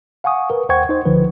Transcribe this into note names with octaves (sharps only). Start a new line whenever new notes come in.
F5 F#5 G#5 C#6 D#6
A#4 B4
D#2 C5 F#5 G5 C#6 G#6
D#4 C5
C#2 D3 F3 B4